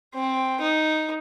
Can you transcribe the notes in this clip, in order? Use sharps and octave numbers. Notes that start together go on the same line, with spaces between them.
C4
D#4